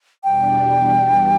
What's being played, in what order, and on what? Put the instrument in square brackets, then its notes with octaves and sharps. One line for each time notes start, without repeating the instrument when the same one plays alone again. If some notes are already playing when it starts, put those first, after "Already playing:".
[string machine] E2 B2 G3 D4 [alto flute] G5